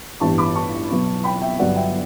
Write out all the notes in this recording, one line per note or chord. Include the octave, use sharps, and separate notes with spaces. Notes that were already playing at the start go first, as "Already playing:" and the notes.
A1 G2 E3 G3 B3 A5 C#6
B5 D6
A5 C#6
B1 B2 F#3 B3
G5 B5
E5 G5
G1 G2 F#3 B3 D5 F#5
E5 G5